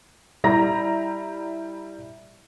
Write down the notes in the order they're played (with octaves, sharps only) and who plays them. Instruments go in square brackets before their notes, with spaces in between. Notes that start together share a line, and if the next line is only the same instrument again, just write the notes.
[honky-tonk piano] G3 E4 A#5 A#6